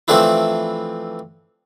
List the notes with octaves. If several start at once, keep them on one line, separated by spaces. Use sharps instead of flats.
E3 F3 A3 C4 D4 E4